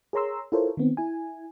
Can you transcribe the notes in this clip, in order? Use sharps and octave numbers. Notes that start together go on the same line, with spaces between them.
G#4 A#4 C#5 A#5 C6 E6
E4 F4 A4 A#4 C5 C#5
D#3 B3 C4
E4 G#5